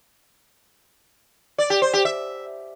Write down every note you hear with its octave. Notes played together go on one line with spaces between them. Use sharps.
D5
G4
C5
G4
E5